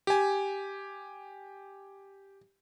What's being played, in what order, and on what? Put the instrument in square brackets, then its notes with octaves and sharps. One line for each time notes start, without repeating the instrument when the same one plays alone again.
[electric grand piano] G4 G#5